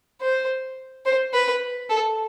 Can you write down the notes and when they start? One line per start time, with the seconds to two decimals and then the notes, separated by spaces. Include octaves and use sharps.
0.21 C5
1.05 C5
1.33 B4
1.90 A4